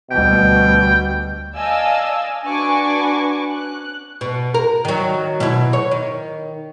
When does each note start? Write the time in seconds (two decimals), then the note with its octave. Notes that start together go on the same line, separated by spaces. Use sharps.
0.11 D2 B2 G3 G5
1.54 D5 D#5 F5 G#5 A5 E6
2.44 D4 F#4 B4 G#5 C#6 D6
3.51 F#6
4.21 B2
4.54 A#4
4.85 D#3 F#3
5.40 B2 E4
5.73 C#5
5.91 D#3